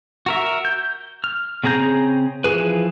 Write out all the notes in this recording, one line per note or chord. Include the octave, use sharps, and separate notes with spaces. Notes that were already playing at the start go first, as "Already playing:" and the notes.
F#4 A#4 E5
G6
F6
C#3 C4 G#4 A#5 G6
E3 F3 E4 G#4 B4